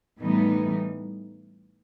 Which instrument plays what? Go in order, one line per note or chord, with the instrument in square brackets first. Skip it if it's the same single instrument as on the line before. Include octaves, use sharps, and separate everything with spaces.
[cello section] A2 E3 G3 B3 D#4